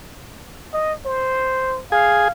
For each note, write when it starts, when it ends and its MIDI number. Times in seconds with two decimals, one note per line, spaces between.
0.73 0.93 75
1.06 1.80 72
1.92 2.28 68
1.92 2.31 77